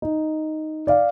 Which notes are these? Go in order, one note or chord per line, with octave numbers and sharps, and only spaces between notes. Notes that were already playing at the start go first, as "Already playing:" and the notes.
D#4
D5 F5